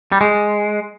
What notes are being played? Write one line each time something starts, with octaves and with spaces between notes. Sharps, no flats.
G3
G#3